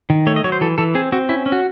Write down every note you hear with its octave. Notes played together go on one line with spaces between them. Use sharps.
D#3
A3 C#5
D#5
F#3 C#5
C5
E3 A4
E3 A4
C4 G#4
C4 F#4
C#4 E4
C#4
F#4